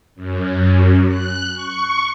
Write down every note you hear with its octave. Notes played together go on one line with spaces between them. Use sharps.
F#2
F#6
C#6